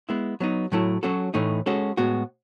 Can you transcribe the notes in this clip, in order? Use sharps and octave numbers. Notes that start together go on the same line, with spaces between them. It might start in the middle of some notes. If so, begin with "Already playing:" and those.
G#3 B3 E4
F#3 B3 D#4
A2 F#3 A3 E4
F#3 C#4 F#4 A4
A2 E3 A3 D#4
G#3 C#4 F#4 A4
A2 G#3 B3 F#4